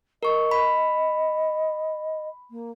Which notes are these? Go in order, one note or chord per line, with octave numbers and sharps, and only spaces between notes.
A#4 D#5 C#6
B5
A#3